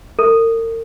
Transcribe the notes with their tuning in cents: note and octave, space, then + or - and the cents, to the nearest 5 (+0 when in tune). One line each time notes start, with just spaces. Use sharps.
A#4 -40